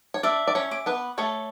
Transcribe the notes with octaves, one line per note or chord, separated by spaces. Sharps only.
C#5
D4 D5 E5
D5
C#4 C#5
D6
B3 B4
A3 A4 C#5